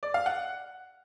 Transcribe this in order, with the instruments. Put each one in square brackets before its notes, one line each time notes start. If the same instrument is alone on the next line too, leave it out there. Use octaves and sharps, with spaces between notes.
[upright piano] D5
F5
F#5